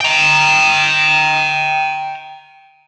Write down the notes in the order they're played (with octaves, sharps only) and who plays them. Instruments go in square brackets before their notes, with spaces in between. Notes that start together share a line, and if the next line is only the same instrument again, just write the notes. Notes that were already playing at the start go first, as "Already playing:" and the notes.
[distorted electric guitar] G5 A#5